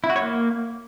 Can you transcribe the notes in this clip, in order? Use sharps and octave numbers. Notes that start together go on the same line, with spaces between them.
E4
F#4
C#5
A#3